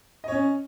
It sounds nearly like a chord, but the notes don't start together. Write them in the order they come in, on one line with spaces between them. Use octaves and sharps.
D#5 C#5 C#4